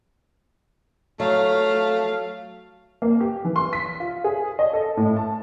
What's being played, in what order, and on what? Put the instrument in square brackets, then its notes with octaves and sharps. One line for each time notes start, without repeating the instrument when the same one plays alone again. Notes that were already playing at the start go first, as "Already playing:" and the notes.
[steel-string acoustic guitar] F#3 [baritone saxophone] A3 [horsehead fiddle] F5
[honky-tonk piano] A#3
G4
E3
C6
B6
F4
G#4
D#5
A4
A2
A5